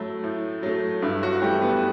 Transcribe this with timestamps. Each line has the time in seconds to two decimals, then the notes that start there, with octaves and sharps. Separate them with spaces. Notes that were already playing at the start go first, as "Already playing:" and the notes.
Already playing: F#3 A3 E4
0.24 A2
0.63 F#3 A3
1.02 G2 E4
1.23 F#3 F#4
1.42 E3 G3 A3 G4
1.62 B3 B4